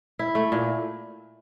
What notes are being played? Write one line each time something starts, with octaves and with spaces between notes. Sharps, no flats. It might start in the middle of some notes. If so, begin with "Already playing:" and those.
E4
A3
A#2